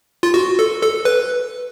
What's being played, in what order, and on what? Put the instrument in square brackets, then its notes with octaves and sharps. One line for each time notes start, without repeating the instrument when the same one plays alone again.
[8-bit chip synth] F4
F#4
A4
A4
B4